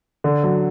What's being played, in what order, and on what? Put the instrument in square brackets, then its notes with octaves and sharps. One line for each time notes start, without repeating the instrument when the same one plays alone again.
[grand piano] D3
F#3